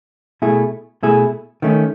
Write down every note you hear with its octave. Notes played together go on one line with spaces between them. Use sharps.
B2 A3 E4 G#4
B2 A3 E4 G#4
D#3 A3 C#4